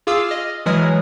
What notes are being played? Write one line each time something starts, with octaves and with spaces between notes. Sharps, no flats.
F4 G#4 F5 D6 E6 C7
D#5 F6
E3 F#3 G#3 D#6 F6